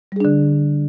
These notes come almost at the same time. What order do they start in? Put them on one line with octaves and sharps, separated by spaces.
G3 G#4 D4 D3